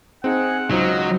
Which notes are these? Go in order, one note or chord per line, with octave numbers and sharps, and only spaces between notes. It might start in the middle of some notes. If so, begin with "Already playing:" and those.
C4 D#4 G#4 F#5
C#2 F#3 D#4 F4 C5 D#5